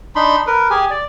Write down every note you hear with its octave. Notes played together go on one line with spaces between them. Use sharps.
D4 D#4 B5 C6
A#4 B4
G4 G#4 G#5
D5